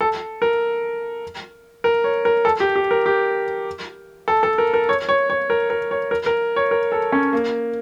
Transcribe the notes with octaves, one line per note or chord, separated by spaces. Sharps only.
A4
A#4
A#4
C#5
A#4
A4
G4
G4
A#4
G4
A4
A4
A#4
A#4
C#5
C#5
C#5
A#4
A#4
C#5
A#4
A#4
C#5
A#4
A4
C#4
A#3